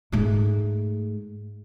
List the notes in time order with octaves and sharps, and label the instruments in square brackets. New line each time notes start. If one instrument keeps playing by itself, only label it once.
[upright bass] G#2 A3